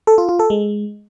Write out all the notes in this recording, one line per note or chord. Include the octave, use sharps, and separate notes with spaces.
A4
F4
F4
A4
G#3